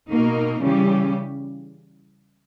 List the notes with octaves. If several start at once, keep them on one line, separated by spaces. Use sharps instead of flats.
B2 A#3 D#4 A#4
C#3 E3 G3 C#4 G4